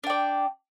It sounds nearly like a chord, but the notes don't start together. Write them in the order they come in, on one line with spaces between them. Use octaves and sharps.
D4 G5 D5